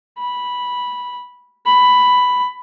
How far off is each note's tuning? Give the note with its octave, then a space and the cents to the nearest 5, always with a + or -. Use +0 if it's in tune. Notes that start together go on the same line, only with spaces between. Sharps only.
B5 -10
B5 +5